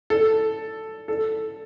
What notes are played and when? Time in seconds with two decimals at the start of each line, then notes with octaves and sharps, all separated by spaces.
0.10 A4
1.08 A4